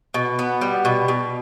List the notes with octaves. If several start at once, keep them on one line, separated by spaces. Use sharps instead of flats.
B2
B3
G3
B2
B2